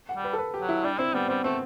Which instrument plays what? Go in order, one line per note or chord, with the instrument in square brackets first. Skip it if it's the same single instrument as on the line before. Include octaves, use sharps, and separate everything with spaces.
[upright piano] F#5
[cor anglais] G3
[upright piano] B4
A4
B4
G4
[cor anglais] F#3
[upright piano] E4
[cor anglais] G3 [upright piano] D4
[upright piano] C4 [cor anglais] E4
[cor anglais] G3 [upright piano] B3
[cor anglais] G3 [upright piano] C4
[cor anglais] A3 [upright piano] C4